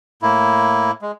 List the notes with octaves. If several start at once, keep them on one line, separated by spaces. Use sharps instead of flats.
A2 A#3 E4
G#3